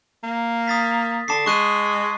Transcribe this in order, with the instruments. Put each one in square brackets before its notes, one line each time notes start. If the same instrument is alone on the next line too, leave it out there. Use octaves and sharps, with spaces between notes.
[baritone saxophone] A#3
[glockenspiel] D#6 A6 B6
[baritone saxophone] D3 [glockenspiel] A5 D6 C7
[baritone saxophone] G#3 [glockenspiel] C#6 F#6 D#7